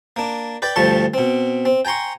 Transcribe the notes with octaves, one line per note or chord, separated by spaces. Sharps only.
A#3 D4
B4 D5 G5
D2 G2 F3 G3 A5 C#6
B2 C4
C4
G5 G#5 A#5 C6 C#6